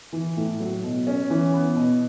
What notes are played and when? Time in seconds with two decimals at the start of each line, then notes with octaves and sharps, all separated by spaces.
0.13 E3
0.37 A2
0.60 F#3
0.84 B2
1.07 C#4
1.30 E3
1.54 B3
1.76 B2